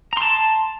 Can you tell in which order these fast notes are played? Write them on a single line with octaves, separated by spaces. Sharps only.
A#5 C6 A5